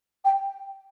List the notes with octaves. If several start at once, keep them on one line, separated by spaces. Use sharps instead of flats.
G5